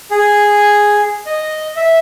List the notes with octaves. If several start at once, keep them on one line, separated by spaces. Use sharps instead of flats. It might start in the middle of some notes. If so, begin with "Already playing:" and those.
G#4
D#5
E5